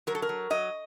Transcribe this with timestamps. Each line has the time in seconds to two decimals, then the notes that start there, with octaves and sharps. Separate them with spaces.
0.07 F#3 A#4
0.15 A4
0.22 A#4
0.29 F#3
0.50 F#3 D#5